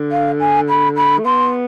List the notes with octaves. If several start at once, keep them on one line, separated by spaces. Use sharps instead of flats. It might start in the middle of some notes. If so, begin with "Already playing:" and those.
Already playing: D3
F5
G#5
B5
B5
A3
B3 C6